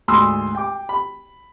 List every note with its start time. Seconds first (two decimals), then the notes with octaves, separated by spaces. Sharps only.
0.08 D2 G#2 B5 C6 D#6 E6
0.55 G5 D6
0.89 B5